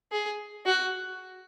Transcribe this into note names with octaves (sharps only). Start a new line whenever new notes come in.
G#4
F#4